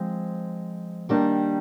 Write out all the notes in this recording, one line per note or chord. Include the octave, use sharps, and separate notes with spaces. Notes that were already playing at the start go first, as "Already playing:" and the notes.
Already playing: F3 G#3 C4
D#3 G3 A#3 D4